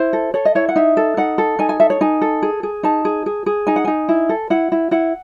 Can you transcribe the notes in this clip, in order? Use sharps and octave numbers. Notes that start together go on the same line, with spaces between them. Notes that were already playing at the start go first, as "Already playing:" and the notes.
Already playing: E4 C5
A4
A4 C#5
D#5
E4 C#5
F#5
D#4 E5
A4
D#4 F#5
A4
D#4 G#5
G#5
A4 E5
C#5
D#4 G#5
A4
G#4
G#4
D#4 A5
G#4
G#4
G#4
D#4 G#5
F#5
D#4 G#5
E4
A4
E4 F#5
E4
E4 F#5